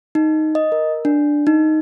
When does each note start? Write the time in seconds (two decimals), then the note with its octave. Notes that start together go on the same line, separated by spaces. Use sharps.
0.15 D#4
0.55 D#5
0.72 A#4
1.05 D4
1.47 D#4